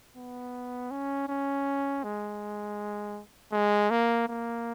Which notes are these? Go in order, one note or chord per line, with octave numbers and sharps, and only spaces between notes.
B3
C#4
C#4
G#3
G#3
A#3
A#3